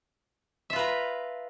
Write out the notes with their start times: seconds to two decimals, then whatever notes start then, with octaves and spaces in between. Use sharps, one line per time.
0.70 E5
0.73 F4
0.76 B4
0.79 A#5